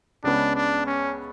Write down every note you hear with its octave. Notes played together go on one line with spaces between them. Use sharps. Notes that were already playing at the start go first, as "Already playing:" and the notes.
C#2 C#3 G#3 B3 D4
D4
C#4